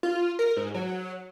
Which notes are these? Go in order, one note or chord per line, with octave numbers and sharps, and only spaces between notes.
F4
A#4
G#2
F#3